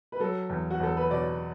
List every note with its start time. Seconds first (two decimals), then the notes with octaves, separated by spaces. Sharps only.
0.12 B4
0.19 F#3 A4
0.50 E2
0.71 F#4
0.80 E2 A4
0.97 B4
1.10 B2 D5